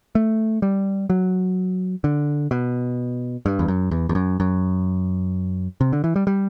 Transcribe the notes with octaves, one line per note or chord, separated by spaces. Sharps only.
A3
G3
F#3
D3
B2
G2
E2
F#2
E2
E2
F#2
F#2
C3
D3
E3
G3
G3